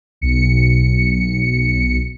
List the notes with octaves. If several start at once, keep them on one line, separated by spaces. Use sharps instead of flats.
B1 C#7